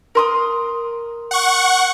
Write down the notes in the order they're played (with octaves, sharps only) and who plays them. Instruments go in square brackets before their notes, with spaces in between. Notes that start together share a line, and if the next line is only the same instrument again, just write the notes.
[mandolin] A#4 C6 D#6
[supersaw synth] F#5 C#6